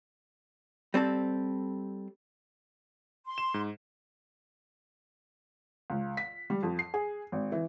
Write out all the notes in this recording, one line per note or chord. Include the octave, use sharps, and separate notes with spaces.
G3 C4 G4 A4
C6
E7
G#2
C#2
B6
G3
F2
C7
G#4
G#1
E3